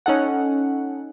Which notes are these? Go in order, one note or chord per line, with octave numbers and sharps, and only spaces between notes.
C#4 D#4 A4 F#5